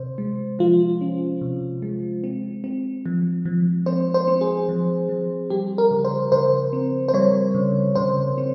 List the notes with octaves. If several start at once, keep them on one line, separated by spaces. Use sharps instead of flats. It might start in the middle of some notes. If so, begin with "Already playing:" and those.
Already playing: C3 C5
G#3
F3 F4
C#4
C3
G#3
C4
C4
F3
F3
C4 C5
C5
C4
G#4
F3
F3
G3 G4
A#4
C#3
C5
C#3 C5
C4
C5
G3 C#5
C#3
C#3 C5
C4